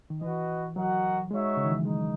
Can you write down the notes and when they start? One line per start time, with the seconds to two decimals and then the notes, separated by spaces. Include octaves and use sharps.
0.10 D#3
0.22 E3 F#4 B4 D#5
0.76 F#3 F#4 A#4 D#5 F#5
1.31 G#3 D#4 F#4 C#5 E5
1.57 C#3
1.64 D#3
1.72 E3
1.78 F#3
1.85 G#3 D#4